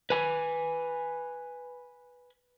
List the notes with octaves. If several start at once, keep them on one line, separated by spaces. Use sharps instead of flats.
B4 G#5